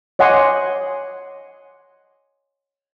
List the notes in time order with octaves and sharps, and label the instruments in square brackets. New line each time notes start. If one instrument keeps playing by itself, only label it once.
[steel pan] C#5 D#5 F#5 G#5 C6 D6